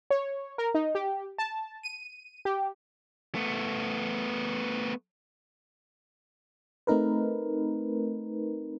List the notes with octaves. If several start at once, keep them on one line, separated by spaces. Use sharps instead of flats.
C#5
A#4
D#4
G4
A5
D#7
G4
A3 B3
A3 C4 D#4 A#4 B4